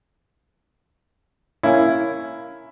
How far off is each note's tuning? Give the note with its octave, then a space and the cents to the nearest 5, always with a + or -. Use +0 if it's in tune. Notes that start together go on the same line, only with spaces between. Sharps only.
A#3 +0 C#4 +0 E4 +10